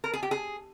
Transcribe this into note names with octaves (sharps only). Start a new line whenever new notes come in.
A#4
G#4
G4
G#4